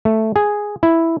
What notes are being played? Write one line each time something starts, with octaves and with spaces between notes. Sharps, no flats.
A3
G#4
E4